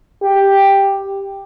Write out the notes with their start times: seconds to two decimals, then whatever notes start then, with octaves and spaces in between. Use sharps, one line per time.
0.23 G4